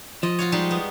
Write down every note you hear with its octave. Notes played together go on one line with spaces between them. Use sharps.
F3 D#5
F4 F#4 C#5
G3 G#3 D#4
B3